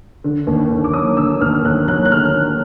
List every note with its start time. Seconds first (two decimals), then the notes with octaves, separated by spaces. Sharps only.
0.24 D3
0.47 D#2
0.71 D#2
0.84 D6
0.93 F#3 D#6
1.17 D3 E6
1.40 D#2 F6
1.64 D#2 F#6
1.88 F#3 F#6
2.05 F#6
2.11 D3 F6